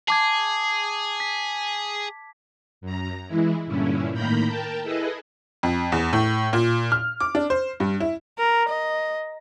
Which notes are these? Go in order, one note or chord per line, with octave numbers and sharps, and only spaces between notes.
G#4 A5 D6 G#6
B6
F#2 A#5
E3 G#3 E4
G2 A#2 D3 C#4 E4
A2 D#3 A#3 A#5 B5 G6
A#4 G5 A5
E4 G#4 A4 B4 D#5
F2
E2
A2
A#2
F6
D6
D4
C5
G2
E4
A#4
D#5